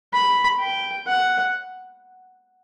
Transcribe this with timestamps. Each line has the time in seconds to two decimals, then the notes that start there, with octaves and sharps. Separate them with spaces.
0.13 B5
0.60 G5
1.07 F#5